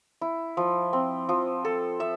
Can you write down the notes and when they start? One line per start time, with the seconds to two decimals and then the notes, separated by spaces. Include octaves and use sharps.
0.21 E4
0.57 F3
0.93 C4
1.29 F3
1.65 A4
2.00 E5